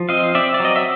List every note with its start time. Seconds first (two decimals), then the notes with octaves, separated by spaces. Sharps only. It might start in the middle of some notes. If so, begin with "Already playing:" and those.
Already playing: F3
0.09 C4 D#5 F5
0.35 C4 D5 E5
0.54 D5
0.60 F#3 D#5
0.76 E5